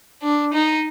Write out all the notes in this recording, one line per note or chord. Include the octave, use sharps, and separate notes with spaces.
D4
D#4